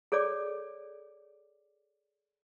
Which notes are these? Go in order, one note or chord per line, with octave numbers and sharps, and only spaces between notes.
G#4 A4 C#5 D5 D6